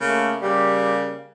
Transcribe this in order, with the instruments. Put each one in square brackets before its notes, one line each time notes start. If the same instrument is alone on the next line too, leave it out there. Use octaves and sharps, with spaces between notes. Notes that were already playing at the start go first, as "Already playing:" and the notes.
[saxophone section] C#3 A#3 [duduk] A3
[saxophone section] C#3 G3 A#3 [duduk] G4